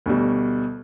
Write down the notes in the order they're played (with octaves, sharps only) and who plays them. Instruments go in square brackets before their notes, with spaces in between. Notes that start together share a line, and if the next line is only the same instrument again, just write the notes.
[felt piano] D2 B2 G3